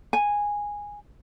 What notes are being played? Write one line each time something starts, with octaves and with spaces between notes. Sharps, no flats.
G#5